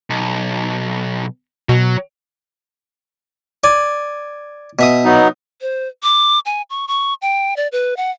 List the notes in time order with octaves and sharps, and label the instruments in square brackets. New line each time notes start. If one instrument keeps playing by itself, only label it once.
[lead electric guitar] B1
[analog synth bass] B2 [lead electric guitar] F#3
[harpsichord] D5 G#5
B2 E5 D#6
[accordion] F#3 B3 D#4
[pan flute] C5
D6
G#5
C#6
C#6
G5
D5
B4
F#5